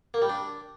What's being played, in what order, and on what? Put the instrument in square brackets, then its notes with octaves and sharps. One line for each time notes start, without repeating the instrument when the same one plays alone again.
[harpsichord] A#3
G3
D4